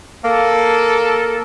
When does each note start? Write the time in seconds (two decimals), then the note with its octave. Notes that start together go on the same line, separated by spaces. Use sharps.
0.24 A#3 A4